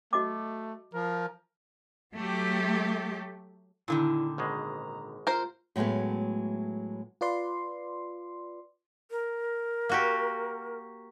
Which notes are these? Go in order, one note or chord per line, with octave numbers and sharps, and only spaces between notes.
A3 F#4 D#5 D6
F3 A#4
F#3 A3 G4
A#2 D3 D#3 E4
G#1 B2 G#3 A#5
F4 A#4 C5
A2 F#3 G#3 A3 B3
F4 B4 D5 C6
A#4
A#3 F#4 G4